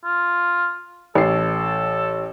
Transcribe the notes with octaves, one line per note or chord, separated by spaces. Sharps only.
F4
A1 A4 C7